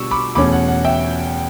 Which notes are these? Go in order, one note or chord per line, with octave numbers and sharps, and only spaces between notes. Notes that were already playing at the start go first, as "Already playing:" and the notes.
Already playing: B2 G3 D4 C#6 E6
B5 D6
E2 B2 A3 C#4 B5 D6
F#5
F#5
E5 G5